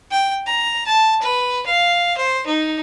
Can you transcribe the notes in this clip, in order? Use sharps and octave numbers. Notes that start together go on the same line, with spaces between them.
G5
A#5
A5
B4
F5
C5
D#4